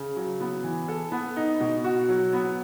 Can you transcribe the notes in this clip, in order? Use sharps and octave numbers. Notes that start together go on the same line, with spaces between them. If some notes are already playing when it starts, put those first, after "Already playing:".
Already playing: C#3
F#3
B3
E3
A4
B3
D#4
B2
F#4
F#3
B3